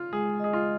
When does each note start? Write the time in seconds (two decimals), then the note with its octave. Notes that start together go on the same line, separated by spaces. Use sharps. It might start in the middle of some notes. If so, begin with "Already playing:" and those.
Already playing: F4
0.12 G#3 G#4
0.40 G#4 D#5
0.53 F4